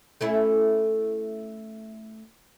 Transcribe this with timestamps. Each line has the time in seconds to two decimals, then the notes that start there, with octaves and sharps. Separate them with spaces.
0.21 A3 C#4 E4